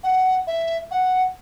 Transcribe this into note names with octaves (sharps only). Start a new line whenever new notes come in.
F#5
E5
F#5